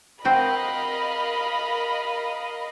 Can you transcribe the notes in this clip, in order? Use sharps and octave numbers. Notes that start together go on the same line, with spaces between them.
C4 F#4 A#4 D#5 F5 G5 B5